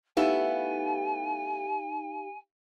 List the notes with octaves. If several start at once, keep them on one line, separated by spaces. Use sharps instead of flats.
A3 B3 D#4 E4 G4 F5 G#5